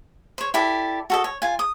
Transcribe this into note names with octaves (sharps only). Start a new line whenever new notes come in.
C5 C#5
E4 G4 A4 D5
F#4 A4 D#5
C#5
F4 G#5
D#6